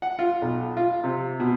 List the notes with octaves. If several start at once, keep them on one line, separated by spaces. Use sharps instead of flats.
F#5
F4
B1
F4
C3
B2